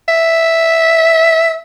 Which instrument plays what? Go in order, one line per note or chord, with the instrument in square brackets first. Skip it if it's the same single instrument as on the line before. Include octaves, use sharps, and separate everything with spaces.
[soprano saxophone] E5